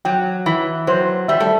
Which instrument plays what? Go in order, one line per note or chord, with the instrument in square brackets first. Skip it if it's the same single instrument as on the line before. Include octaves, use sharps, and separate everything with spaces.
[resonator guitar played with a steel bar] F#3 [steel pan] G5
[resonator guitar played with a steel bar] E3 [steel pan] B5
[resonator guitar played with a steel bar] F#3 [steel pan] C5
[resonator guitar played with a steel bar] G3 [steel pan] E5
[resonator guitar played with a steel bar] A3